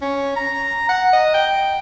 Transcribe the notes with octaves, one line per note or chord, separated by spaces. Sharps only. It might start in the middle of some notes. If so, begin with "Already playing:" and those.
C#4
A#5
F#5
D#5
G5